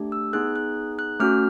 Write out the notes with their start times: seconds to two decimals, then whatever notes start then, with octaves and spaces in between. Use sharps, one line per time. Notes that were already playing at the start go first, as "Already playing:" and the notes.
Already playing: A3 D4 G4
0.12 E6
0.33 B3 D#4 G#4 F#6
0.56 F#6
0.99 F#6
1.20 A3 C#4 F#4 F6